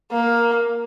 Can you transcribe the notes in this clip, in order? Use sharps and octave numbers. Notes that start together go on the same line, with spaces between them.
A#3